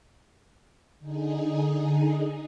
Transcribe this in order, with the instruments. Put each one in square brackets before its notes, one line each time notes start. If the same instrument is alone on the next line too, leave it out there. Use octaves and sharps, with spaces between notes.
[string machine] D3 D#4 G#4